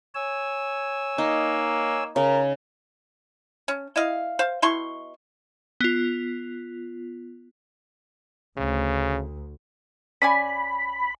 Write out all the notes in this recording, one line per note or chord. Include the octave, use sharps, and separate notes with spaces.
C#5 G#5 E6
A#3 D#4
C#3 A#4
C#4
E4 D#5 F5
C5 F5
B2 E4 C6 C#6
B3 F4
D2 C#3
C#4 D5 G#5 B5